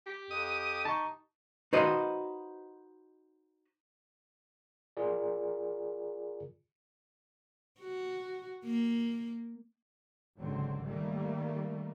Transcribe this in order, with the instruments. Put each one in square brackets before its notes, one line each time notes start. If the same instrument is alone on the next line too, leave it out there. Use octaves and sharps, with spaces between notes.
[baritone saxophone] G4
[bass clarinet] F2 [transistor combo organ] D#6
[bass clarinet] D#4 [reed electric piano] A5 C#6
[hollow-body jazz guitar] D#4 F#4 B4 C5 D#5
[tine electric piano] F4 G#4 A#4 D5
[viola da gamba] F#4
A#3
[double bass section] G#1 C#2 D3 F#3 C4
D#3 G3 A3 A#3